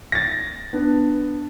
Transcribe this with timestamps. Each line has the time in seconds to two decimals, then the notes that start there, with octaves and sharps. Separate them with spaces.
0.12 A6 A#6
0.73 B3 D4